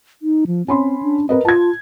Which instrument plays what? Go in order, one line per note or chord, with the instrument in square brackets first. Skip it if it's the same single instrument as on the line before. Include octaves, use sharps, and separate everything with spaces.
[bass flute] D#4
F3
[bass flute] C4 [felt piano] C#4 B5 C6
[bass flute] D4
[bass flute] C4 [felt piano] A#4 B4 D#5
[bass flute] F4 [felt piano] A5 G#6